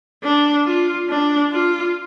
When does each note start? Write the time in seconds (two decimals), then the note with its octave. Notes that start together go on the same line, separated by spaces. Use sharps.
0.23 D4
0.66 F4
1.09 D4
1.52 F4